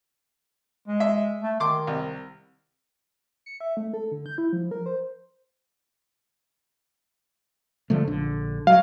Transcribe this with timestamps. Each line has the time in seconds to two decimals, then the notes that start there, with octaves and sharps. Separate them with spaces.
0.87 G#3
1.00 E5
1.41 A3
1.60 D#3 C6 D6
1.87 C2
3.46 C#7
3.60 E5
3.77 A3
3.93 A4
4.11 D3
4.26 G6
4.38 E4
4.53 F3
4.71 A#4
4.86 C5
7.90 D3 F3 A3
8.07 A#1 D3
8.67 F#3 F5